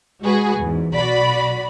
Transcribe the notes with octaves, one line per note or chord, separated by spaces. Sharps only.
G#3 F#4 G#4 B4
E2 G#2
B1 F#4 D5 B5